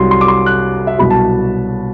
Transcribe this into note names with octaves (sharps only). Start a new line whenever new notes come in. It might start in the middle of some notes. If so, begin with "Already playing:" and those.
Already playing: C2 C3 F#3 C6
C6
D6
C6
F#6
E5
C2 B2 F#3 B5
A5